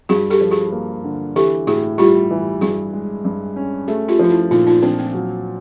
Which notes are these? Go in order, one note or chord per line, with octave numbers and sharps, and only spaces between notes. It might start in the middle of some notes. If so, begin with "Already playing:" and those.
G2 F#4 G#4
G4 A4
F3
F#4 G#4
A#3
D3
E3 G4 A4
A2 F#4 G#4
G3 F4 G4
E3
G2 F#4 G#4
G#3
G2
C#4
A3 F#4 G#4
F4 G4
F3 F4
E4 F#4
A#2 D#4 F4
D#4 F4
F3 C4 D4
C4
F#3